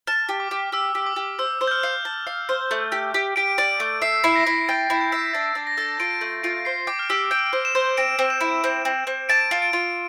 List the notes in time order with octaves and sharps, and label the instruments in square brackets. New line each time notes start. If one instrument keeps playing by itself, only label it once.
[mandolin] A5 [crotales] F6
[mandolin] G4
[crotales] D6
[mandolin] G4
[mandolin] G4 [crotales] E6
[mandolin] G4
[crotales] D6
[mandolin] G4
[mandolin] C5 [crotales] E6
[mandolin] C5
[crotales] G6
F6
[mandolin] F5
A5
F5
C5
A3
G4
G4
[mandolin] G4 [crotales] D7
[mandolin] D5 [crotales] D7
[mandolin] A3 [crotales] D7
[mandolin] E5 [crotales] C7
[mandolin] E4 [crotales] C7
[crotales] A#6
[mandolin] E4
[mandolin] G5 [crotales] A6
[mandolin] E4
[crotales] G6
[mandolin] E5
[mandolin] D4 [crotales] A6
[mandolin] D4
[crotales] A#6
[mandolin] A4
[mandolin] F4 [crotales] D7
[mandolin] A3
[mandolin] F4 [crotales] D7
[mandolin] C5 [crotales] C7
[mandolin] G5 [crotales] D6
[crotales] F6
[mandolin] G4 [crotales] E6
[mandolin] G5 [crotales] D7
[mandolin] C5
[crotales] E7
[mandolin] C5
[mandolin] C4 [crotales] D7
[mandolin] C4
[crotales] E7
[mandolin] E4
C4
C4
C4
[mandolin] A5 [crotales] D7
[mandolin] F4
[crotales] D7
[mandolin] F4